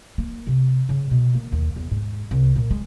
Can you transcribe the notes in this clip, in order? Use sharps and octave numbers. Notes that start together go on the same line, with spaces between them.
A#3
C3
C#3
B2
A#3
D#2
E2
G#2
C2
A#2
G#3